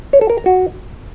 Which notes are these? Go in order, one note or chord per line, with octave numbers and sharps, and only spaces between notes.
C#5
A4
A#4
A#5
F#4